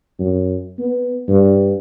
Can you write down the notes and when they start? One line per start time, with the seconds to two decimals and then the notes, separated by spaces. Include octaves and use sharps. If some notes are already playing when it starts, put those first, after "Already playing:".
0.19 F#2
0.79 B3
1.29 G2